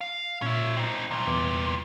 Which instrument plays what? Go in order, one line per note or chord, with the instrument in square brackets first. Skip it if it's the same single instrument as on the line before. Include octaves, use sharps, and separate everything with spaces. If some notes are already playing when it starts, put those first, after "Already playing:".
[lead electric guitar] F5
[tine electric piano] A#2 [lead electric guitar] C#4 E5
[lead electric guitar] C4 D#4
[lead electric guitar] C2 A#2 [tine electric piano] A#5
[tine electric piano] E2 B4 D6